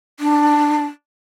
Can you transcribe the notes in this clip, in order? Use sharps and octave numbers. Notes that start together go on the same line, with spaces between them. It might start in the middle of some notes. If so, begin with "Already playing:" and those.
D4